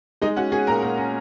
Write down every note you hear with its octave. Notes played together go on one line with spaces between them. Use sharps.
G#3 D#4 D#5
C#4 F#4 F#5
C#4 G#4 G#5
A#2 A#4 A#5
A#2 A#4
C#4